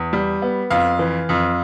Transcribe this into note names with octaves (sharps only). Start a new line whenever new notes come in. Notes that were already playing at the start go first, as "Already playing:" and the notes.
Already playing: E2
G3
B3
F2 F5
E3
F2